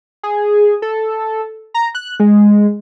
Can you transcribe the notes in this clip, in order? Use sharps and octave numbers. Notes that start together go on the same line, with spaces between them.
G#4
A4
A#5
F#6
G#3